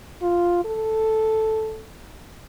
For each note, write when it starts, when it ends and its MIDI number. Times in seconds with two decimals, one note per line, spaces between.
0.23 0.64 65
0.65 1.86 69